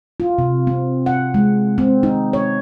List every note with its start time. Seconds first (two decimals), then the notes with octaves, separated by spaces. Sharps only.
0.20 F4
0.38 C3
0.67 C4
1.06 F#5
1.34 G#3
1.78 C4
2.03 D#4
2.33 C#5